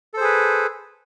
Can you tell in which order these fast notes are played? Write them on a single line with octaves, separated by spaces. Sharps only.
A4 C5 G#4 B4